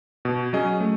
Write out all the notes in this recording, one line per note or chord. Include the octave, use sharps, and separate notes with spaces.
B2
F#3 C#4 G#4 D#5
A3